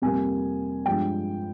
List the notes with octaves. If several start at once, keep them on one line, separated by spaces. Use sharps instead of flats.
F2 C3 G3 A#3 G#5
G2 F3 G#3 G5